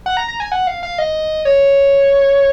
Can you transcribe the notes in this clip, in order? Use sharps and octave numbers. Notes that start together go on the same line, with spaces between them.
F#5
A#5
A#5
G#5
F#5
F5
F5
D#5
C#5